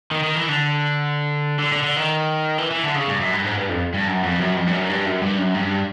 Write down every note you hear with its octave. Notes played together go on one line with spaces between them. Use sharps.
D#3
D#3
E3
D3
D3
D3
D3
D#3
E3
E3
D3
C#3
G2
F#2
G2
G#2
G2
F2
G2
F#2
F2
F#2
F2
G2
F#2
G2
F#2
G2
F#2
G2